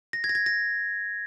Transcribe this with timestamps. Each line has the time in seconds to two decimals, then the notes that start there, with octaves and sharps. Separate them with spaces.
0.13 A#6
0.24 G#6
0.29 A#6
0.35 G#6
0.46 A#6